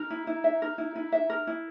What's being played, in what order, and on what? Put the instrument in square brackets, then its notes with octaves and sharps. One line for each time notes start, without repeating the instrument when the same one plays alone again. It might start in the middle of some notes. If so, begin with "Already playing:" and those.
Already playing: [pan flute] D#4 [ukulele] A#4
[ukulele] E4
E4
E5
A#4
E4
E4
E5
A#4
E4